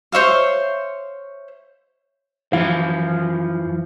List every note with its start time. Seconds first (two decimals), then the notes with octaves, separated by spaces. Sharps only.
0.12 C5 C#5 E5 F5
2.53 F#2 E3 F3 F4 F5